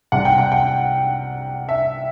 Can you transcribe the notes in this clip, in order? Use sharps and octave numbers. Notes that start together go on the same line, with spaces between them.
C2 C3 G3 F#5
G5
F#5
G5
E5